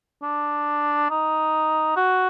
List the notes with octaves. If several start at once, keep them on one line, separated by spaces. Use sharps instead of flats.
D4
D#4
F#4